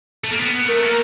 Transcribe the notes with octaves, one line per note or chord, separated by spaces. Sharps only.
A3
A#3
B3
A3 A#4
A#3